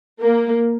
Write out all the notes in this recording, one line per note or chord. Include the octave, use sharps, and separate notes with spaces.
A#3